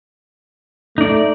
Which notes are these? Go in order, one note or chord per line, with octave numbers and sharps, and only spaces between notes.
A3 D#4 D5